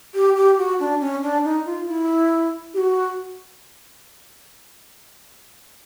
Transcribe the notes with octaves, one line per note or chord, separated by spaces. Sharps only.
G4
G4
F#4
D4
C#4
D4
D#4
F4
E4
G4
F#4